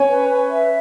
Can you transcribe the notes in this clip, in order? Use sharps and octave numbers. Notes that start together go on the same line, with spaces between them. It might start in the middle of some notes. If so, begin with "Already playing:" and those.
Already playing: C#4 C#5 G#5
B4
B4
E5